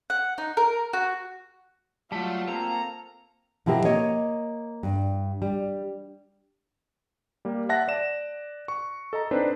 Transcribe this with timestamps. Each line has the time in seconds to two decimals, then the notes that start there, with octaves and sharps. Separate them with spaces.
0.10 F#5
0.38 D#4
0.57 A#4
0.93 F#4
2.12 F#3 G3 A3 F4
2.48 A#3 C4 A4 A#5
3.66 B2 F3 C4 E4 G4 A#4
3.84 A#3 C#5 D#5
4.83 G2
5.42 G3
7.45 G3 A#3
7.69 E5 F#5 A5 F#6 A#6
7.88 D5 E7
8.68 C#6
9.13 A4 D#5 A#5
9.31 C4 D4 D#4 B4 C5